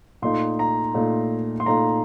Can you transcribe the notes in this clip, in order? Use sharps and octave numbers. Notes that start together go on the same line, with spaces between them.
A#2 A3 D#4 C6
A#5
A#2 A3 D#4
C6
A#2 A3 D#4 A#5